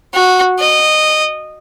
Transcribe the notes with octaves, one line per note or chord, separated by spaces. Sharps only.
F#4
D#5